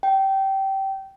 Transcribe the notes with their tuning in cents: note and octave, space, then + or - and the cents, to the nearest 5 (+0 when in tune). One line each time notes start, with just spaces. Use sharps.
G5 -20